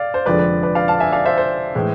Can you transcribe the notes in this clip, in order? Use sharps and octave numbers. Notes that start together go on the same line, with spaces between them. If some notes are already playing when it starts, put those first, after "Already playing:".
Already playing: D5 F5
C5
F1 F2 D3 F3 G#3 B4 D5
B4
B4 D5
D5 F5
F5 A5
E5 G#5
D5 F5
C5 E5
C5
A2 E3 G#3